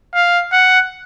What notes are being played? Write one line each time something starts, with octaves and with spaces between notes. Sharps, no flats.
F5
F#5